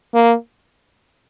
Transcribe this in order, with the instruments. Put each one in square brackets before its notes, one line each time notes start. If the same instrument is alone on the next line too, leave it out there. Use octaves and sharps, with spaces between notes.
[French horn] A#3